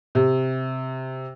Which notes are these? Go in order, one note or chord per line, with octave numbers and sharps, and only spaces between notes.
C3